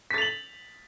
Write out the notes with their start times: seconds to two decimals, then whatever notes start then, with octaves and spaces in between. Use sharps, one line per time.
0.11 B6
0.14 A6
0.18 F7
0.22 F#7